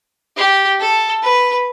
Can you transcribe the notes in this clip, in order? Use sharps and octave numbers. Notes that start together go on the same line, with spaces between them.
G4
A4
B4